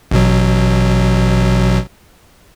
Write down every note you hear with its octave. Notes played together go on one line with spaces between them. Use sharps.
A1 B2 F#3